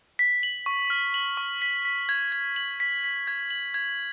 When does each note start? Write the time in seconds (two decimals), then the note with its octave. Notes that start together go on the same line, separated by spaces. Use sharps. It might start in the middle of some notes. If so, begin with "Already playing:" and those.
0.19 B6
0.43 F#7
0.66 C#6
0.90 F6
1.14 F#7
1.37 C#6
1.62 B6
1.85 B6
2.09 G#6
2.32 G#6
2.56 F#7
2.80 B6
3.04 B6
3.27 G#6
3.51 F#7
3.74 G#6